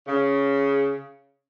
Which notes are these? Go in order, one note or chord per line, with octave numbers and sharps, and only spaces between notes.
C#3